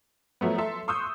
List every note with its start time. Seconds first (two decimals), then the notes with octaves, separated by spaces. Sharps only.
0.41 F3 F#3 A3 B3
0.58 A4 E5 C6
0.88 C6 C#6 D#6 E6 F#6 G6